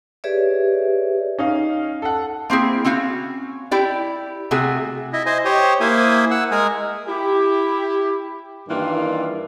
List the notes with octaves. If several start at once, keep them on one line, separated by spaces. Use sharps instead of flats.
G4 G#4 B4 C#5 D5 E5
C#4 D#4 F5
A4 F#5
A#3 C4 E4 G#4
C4 C#4 F#4 F5
E4 G4 D5
C3 A3 F#4 G#4
E4 D#5
C5 D#5 G#5
G4 C5 C#5 D#6
A#3 E4 C5 G#5 D#6
F#5 E6
G#3 A#4 G#5 D#6
E4 G4
G2 D#3 E3 A#3 F4